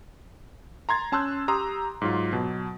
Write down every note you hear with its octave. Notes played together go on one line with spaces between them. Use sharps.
A#5 C6 G#6 A6
C#4 A5 C6 E6 F#6 G6
G4 A#5 C6 D#6 E6
G#2 F#3 F4
B2 F#3